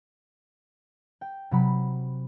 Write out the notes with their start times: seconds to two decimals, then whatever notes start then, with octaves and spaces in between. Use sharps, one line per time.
1.21 G5
1.51 C3 F#3 B5